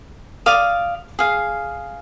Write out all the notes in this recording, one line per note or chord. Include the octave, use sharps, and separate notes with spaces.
D5 F5 D#6
G#4 F5